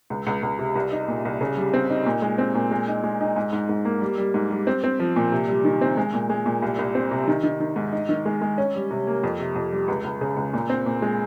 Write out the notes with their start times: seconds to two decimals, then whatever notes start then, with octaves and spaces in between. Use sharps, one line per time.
0.10 C#2
0.27 C#2
0.43 C#2
0.59 C3
0.76 C2
0.92 D#4
1.08 A#2
1.25 C2
1.41 C#3
1.57 G3
1.74 C4
1.90 D#4
2.06 A#2
2.22 G#3
2.38 C4
2.55 A#2
2.71 G#3
2.88 D#4
3.04 G#3
3.21 D#4
3.36 G#2
3.53 G#2
3.69 G#2
3.85 A#3
4.01 G3
4.18 G3
4.34 G#2
4.50 G3
4.67 C4
4.84 C4
4.99 F3
5.16 A#2
5.32 C3
5.48 G3
5.64 D#3
5.81 C4
5.97 G#3
6.14 A#2
6.30 G#3
6.46 A#2
6.62 C2
6.79 C2
6.95 C4
7.11 C3
7.28 D#3
7.43 D#3
7.60 D#3
7.76 G#2
7.92 D#4
8.09 D#3
8.26 G#3
8.42 G#3
8.58 C#4
8.75 G3
8.91 C3
9.07 A#3
9.24 F2
9.40 C3
9.55 F2
9.72 G3
9.88 C#2
10.05 C#2
10.21 C#3
10.37 C#2
10.53 A#2
10.70 C4
10.86 A#2
11.02 G#3